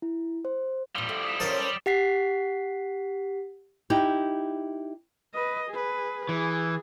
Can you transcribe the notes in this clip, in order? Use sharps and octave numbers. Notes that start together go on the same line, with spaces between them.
E4
C5
E2 A#2 F3 G3 E6 G7
E4 A4 D6 D7 F#7
D#6 B6 E7
C#4 E4 A4 A#4 C5 A5
G3 D6 A6
G4 F#5 B6 C7
D#4 E4 G4
B4 D#5
G#4 B4
E3 G#4